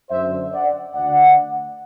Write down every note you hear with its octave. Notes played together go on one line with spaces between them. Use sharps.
F#2 C5 E5
D3
D5 F#5
D2 D3 D5 F#5